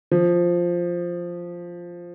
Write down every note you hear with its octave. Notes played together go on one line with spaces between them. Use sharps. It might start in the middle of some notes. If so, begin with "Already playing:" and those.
F3